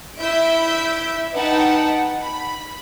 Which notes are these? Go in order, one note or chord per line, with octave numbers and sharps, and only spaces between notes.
E4 E5 G6 D7
D#4 B4 F#5 G5 A5
B5